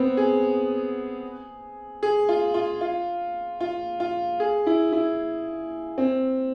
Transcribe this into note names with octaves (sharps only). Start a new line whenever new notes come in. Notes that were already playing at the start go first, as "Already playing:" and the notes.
Already playing: B3 C4
G#4
G#4
F4
F4
F4
F4
F4
G#4
E4
E4
C4